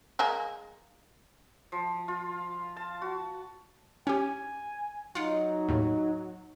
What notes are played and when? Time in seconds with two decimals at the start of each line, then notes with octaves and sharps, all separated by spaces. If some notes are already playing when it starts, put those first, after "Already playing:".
0.19 G#3 A#3 A#4
1.72 F3
2.08 F4
2.76 A5
3.02 F#4
4.07 C#4 G4 G#5
5.15 F#3 D#4 F4 F#5
5.68 D#2 A2